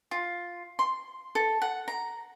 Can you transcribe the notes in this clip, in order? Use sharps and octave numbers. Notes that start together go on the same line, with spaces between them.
F4
C6
A4
F#5
A#5